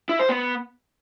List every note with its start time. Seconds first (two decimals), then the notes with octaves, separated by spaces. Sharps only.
0.09 E4
0.19 C5
0.29 B3